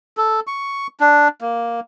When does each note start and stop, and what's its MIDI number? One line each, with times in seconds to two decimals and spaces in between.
0.17 0.40 69
0.47 0.87 85
1.00 1.28 62
1.41 1.80 58